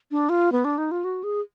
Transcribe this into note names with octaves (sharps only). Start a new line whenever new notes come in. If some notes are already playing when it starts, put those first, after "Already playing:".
D4
F4
B3
D4
D#4
F4
F#4
G#4